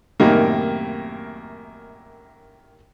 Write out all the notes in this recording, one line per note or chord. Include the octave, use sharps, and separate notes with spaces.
F#2 A2 C3 D#3 G3 A#3